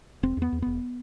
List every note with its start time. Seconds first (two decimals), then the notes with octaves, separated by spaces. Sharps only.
0.23 E1 C4
0.37 E2 B3
0.52 E2
0.62 E1 B3